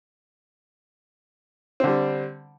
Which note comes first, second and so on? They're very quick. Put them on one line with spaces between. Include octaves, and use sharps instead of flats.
C4 D3 G3